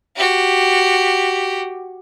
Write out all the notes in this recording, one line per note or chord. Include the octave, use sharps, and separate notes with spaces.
F#4 G4